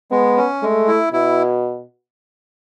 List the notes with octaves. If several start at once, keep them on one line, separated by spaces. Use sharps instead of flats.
G#3 B3
C#4
G#3 A3
E4
B2 E4